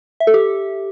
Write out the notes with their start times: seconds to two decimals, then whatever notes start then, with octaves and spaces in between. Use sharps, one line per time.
0.20 E5
0.27 A4
0.34 G4